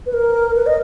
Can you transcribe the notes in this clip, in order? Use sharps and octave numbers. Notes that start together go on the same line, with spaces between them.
B4
A#4
B4
D#5